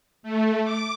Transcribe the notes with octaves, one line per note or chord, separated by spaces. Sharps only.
A3
D6